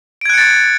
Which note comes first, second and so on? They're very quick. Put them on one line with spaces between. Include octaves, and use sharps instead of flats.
D7 G#6 F#6 C#7 A6